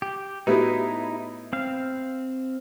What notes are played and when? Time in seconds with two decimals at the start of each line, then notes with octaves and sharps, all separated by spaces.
0.02 G4
0.47 A2 B3 D#4 E4 F#4 G4
1.53 C4 F5